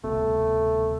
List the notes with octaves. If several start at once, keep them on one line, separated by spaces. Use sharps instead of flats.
D1 C2 B2 A3